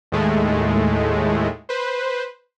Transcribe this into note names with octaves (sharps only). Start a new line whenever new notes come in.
D#2 A2 G#3 A3
B4 C5